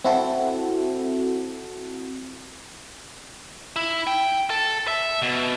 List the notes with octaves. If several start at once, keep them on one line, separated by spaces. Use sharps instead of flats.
C4 E4 F#4 A4
E4
G5
A4
E5
B2